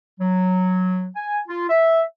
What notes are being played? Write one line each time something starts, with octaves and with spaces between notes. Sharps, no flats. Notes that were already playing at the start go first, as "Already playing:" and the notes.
F#3
G#5
F4
E5